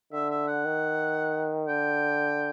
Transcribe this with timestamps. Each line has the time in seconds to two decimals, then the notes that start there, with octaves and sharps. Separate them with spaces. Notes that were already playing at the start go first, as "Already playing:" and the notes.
0.13 D3 E5
0.30 E5
0.47 F#5
0.65 D#3
1.68 D3 G5